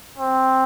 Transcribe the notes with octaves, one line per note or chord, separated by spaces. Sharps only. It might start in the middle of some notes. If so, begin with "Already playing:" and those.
C4